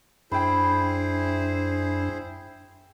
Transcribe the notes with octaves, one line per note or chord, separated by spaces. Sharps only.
F#2 D4 E4 G#4 C5 G5 B5